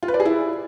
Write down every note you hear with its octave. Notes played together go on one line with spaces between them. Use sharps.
F4
B4
D5
G#4
E4